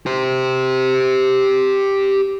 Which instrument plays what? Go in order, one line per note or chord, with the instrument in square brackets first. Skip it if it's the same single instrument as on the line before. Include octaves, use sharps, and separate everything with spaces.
[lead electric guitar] G4 C5